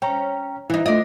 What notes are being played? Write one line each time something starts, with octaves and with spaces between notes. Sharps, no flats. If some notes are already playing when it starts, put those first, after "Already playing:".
C#4 G5 A#5
E3 D#4 E4
A3 D4 F4 D#5